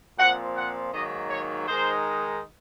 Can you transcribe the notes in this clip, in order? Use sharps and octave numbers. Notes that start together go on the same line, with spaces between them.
A#2 F3 C4 F#5
F#5
G#2 D#3 F#3 A#3 D#5
C#5
D#3 G#3 D#4 C5